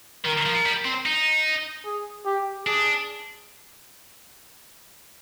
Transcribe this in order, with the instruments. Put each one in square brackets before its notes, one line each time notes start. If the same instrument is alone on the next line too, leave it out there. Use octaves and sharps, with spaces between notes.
[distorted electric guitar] D#3 [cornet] A#4
[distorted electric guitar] F3
G3
C4
D#4
[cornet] G#4
G4
[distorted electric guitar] D4 [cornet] G#4